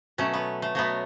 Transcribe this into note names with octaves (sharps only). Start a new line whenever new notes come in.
B2 F#3 A3 C#4
B3
A3
B2 F#3 A3 B3